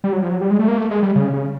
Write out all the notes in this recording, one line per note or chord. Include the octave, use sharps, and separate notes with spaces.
G3
F#3
F3
F#3
G3
G#3
A3
A#3
A3
G#3
G3
C#3
C#3